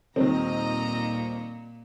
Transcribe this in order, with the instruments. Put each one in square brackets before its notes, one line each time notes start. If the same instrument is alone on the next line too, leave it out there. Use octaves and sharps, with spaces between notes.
[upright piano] D#1 [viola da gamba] A#2 [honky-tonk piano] D#3 C4 [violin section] D#5 A#5